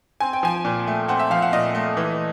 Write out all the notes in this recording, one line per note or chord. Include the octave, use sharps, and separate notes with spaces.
C4 G#5
G5
F3 G#5
A#2
A3
C4 F#5
E5
F3 F5
F#5
A#2 D#5
A3
E3